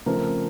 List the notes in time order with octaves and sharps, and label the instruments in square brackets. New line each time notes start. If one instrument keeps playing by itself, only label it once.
[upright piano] C#3 F3 A3 C4 A#4